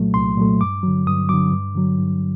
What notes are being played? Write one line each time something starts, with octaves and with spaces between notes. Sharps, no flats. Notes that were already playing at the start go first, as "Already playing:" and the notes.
Already playing: C2 A#2 F#3 A3
C2 C6
A#2 F#3 A3
G2 D6
D3 F#3
G2 D#6
D3 F#3 D6
G2
D3 F#3
G2